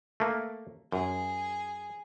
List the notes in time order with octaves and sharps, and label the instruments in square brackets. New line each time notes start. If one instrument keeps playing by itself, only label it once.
[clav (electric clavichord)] A3 A#3
[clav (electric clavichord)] F#2 [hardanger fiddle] G#4